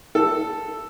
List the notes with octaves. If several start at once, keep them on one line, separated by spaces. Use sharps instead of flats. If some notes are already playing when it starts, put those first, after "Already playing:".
A4